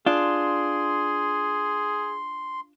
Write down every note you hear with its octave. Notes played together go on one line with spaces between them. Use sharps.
D4 F4 G#4 C6